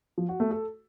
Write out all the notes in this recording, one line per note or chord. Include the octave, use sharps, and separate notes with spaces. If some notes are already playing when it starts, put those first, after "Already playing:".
F3
F#4
A3
A4